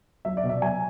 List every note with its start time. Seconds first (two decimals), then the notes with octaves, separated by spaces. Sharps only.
0.25 F#3 E5
0.37 D5
0.44 B2
0.49 E5
0.62 F#3 G#5